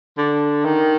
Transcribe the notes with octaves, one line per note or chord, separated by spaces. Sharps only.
D3
D#3